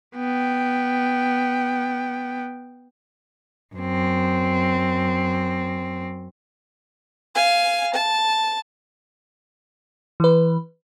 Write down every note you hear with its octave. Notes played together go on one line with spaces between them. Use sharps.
B3 G5
F#2 C4
F5 G#5
A5
E3 B4